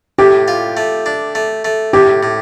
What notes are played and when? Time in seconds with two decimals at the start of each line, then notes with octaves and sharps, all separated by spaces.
0.18 A2 G4
0.48 F4
0.77 A3
1.06 D4
1.35 A3
1.65 A3
1.93 A2 G4
2.23 A2